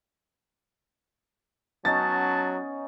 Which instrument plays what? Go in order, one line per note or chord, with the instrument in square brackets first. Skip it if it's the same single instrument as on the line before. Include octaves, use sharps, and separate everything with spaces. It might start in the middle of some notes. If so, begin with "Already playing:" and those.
[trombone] F#3 [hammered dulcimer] B3 C#4 D#4 [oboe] A5 [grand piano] A6